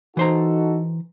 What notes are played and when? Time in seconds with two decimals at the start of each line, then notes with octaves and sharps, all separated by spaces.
0.17 E3 D#4 F#4 A4 C5 A#5